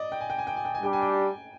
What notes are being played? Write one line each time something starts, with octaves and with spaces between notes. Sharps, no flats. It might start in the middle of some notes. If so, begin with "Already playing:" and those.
Already playing: D5 D#5
G5
G#5
G5
G#5
G5
G#5
G5
G#5
G3 D4 G4 G5
G#5
G5